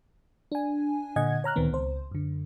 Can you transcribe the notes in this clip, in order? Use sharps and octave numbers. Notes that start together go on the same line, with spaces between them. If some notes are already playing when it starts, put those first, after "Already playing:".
D4 G#5
A#2 D3 D#5 F#5 G#5 G#6
C#5 A#5 F6 F#6
D2 A#2 D#3 B3 C4
C#2 C5
F#2 D3